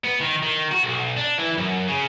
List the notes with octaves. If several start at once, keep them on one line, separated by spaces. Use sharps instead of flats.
B3
D#3
D#3
F#4
B1
D4
E3
F#2
C#3